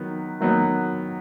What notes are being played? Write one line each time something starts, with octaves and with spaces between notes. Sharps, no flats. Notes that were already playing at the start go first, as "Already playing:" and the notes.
Already playing: D#3 F#3 B3
D#3 F#3 B3